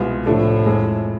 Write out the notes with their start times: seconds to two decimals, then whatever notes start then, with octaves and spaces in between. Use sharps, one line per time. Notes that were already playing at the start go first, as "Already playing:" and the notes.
Already playing: C2 B2 G#3 B3 F4
0.26 A2 C3 F3 A3 D4 A4
0.66 F2 E3 G#3